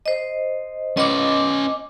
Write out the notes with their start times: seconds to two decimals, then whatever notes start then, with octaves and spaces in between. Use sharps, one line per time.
0.06 C5 D#5
0.97 C#4 B4 D#5 D6